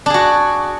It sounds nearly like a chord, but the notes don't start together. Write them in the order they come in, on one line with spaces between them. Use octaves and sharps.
D4 G#4 F#4